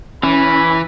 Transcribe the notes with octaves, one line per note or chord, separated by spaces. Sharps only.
E3 C#4 B5